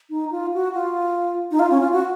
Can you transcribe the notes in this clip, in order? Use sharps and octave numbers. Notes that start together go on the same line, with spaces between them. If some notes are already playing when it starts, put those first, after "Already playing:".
D#4
F4
F#4
F4
D#4
F4
C#4
F4
F#4